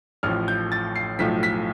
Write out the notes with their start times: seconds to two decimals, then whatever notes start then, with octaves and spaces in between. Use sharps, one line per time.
0.23 A1 A2 F3 F6
0.48 G6
0.72 A6
0.96 C7
1.19 B1 A2 F3 B6
1.43 B6